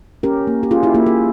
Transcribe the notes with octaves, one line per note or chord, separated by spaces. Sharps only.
C#4 G4 A#4
A#3
G4
C#4 F4 G#4
E4 G4
A#3 E4 G4
F4 G#4